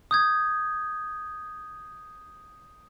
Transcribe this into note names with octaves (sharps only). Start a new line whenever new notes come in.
D#6 G6 G#6